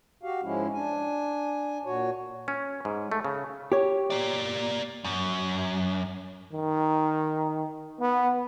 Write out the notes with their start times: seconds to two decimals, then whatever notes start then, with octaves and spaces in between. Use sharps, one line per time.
0.23 F#4 G4 F5
0.43 G#2 F3 G#3 C#4 E4
0.73 D4 G#5
1.85 A#2 F#4 C#5
2.48 C#4
2.85 G#2
3.12 A3
3.25 C#3
3.72 G4 C#5
4.10 A#3 D5
5.04 F#2
6.53 D#3
8.01 B3